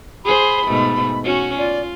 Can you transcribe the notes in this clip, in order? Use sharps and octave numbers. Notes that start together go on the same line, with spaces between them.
G#4 C5 B5
G#2 B2 A3
C#4 F#4
F4 D5